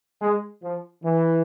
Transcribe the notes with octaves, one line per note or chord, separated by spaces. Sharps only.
G#3
F3
E3